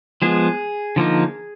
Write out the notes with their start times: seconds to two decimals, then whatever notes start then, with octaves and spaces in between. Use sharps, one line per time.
0.22 F3 G#3 B3 G#4
0.96 D3 F3 A#3 D#4